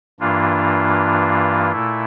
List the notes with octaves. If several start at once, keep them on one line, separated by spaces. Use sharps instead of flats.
G2 E3 A#3 D4 F4
A#2 A3 E4